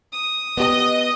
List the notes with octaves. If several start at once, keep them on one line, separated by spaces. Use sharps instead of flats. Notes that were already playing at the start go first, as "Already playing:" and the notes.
D#6
B3 G4 D#5